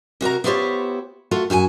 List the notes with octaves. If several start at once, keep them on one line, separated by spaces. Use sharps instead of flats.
C3 F#4 A#4 A#5
B3 E4 F4 G4 C5 C#5
A3 F4 F#4 F#5
F#2 F#4 G4 G#5